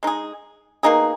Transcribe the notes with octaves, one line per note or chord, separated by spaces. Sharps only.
G#3 D#4 G#4
B2 A#3 D#4 G#4